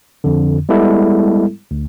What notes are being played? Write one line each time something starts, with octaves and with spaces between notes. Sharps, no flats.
F2 D3
G3 G#3 B3 E4 A4
D2